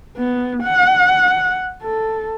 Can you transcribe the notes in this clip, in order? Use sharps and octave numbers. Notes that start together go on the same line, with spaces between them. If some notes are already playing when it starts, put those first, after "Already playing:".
B3
F#5
A4